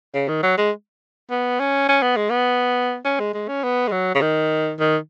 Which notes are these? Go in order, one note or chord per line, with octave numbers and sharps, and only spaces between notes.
C#3
D#3
F#3
G#3
B3
C#4
C#4
B3
G#3
B3
C#4
G#3
G#3
C#4
B3
G#3
F#3
C#3
D#3
D#3